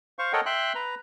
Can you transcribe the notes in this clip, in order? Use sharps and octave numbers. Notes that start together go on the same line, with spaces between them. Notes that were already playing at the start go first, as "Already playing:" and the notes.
C5 F5 C#6
A4 A#4 C#5 D#5 F#5 G5
E5 G5 C6 F#6
B4 A#5